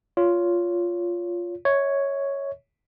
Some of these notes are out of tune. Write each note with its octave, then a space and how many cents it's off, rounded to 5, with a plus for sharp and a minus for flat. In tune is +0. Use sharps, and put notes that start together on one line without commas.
F4 +0 C#5 +20
C#5 +0 E5 -35